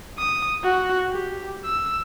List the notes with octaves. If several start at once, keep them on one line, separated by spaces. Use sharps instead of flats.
D#6
F#4
G4
E6